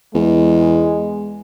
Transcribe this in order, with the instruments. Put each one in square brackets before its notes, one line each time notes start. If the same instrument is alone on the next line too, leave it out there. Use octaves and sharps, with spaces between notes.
[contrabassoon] E2 [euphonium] G#3